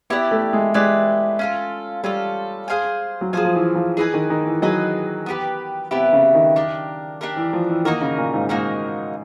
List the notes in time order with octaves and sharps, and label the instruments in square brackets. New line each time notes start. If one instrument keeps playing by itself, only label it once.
[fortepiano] B3 [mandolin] E4 G4 B4 D5
[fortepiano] A3
G#3
[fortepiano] G#3 [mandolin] E4 G4 B4 D5
[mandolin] C#4 F4 A4
[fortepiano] G3 [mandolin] C#4 F4 A4
[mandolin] G#4 C5 F5 G#5
[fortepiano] F#3
[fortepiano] F3 [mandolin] G#4 C5 F5 G#5
[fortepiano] F3
E3
F3
[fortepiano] E3 [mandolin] G#4 B4 D#5 G#5
[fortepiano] D#3
D#3
E3
[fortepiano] F#3 [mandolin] G#4 B4 D#5 G#5
[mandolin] B3 E4 G4 B4
[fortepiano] C3 [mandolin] B3 E4 G4 B4
[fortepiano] C#3
D#3
[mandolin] D4 G4 A#4
D4 G4 A#4
[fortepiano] E3
F3
E3
[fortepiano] D#3 [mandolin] A#3 D#4 F#4 A#4
[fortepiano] C#3
A#2
G#2
[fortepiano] G#2 [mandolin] A#3 D#4 F#4 A#4